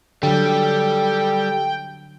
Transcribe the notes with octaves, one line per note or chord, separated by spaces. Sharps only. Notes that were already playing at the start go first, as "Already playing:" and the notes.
D3 F#3 G3 A4 G5